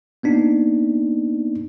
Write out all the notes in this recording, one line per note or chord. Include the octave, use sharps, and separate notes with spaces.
A#3 B3 D4 D#4